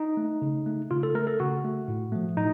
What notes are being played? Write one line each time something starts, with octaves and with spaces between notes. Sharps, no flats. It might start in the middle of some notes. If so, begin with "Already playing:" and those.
Already playing: D#4
A3
C#3
A3
C#3 F4
A4
A3 A#4
A4
C#3 F#4
A3
A2
F3 A3
A2 D#4